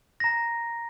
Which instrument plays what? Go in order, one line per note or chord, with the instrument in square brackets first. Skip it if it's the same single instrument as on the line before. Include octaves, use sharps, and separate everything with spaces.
[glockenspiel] A#5 A#6